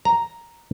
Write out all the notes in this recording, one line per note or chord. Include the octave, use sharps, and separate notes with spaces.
A#5